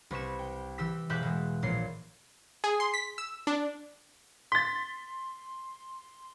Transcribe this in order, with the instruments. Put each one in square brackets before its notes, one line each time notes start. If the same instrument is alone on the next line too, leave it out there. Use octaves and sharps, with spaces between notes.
[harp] C2 B4 C#6 E7
G5
E3 G4 E6 B6
E1 E5 D6 F#6 G6 B6
B2 E3 G#3
A#1 A#2 C#5 C7
[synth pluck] G#4
C6
B6
E6
D4
[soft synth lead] C6 [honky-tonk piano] A6 B6